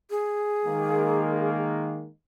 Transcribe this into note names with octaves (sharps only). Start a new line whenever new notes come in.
G#4
D#3 G#3 A#3